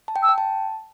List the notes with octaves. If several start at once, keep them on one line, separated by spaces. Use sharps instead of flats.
A5
G5
E6
G5
A5